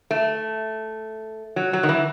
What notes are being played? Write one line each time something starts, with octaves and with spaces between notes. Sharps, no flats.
A3
F#3
F#3
D#3
E3